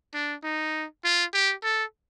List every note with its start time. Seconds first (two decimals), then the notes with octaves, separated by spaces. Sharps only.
0.14 D4
0.44 D#4
1.04 F4
1.33 G4
1.64 A4